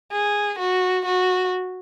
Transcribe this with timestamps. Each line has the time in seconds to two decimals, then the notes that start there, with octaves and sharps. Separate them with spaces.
0.12 G#4
0.59 F#4
1.05 F#4